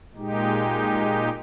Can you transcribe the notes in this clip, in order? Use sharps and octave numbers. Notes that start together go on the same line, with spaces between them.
A#2 G#3 D#4 G4